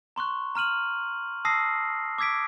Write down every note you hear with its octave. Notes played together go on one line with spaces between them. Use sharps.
A#5 C6 C#6 F#6
A#5 F6 D#7 F#7
A5 D#6 E6 A#6 C7
D6 E6 G#6 B6 D7